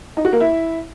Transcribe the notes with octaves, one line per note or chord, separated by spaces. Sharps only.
D#4
F#4
A#3
E4